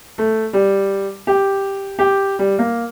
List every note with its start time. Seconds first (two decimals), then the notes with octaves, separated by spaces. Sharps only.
0.18 A3
0.53 G3
1.27 G4
1.99 G4
2.39 G3
2.59 A#3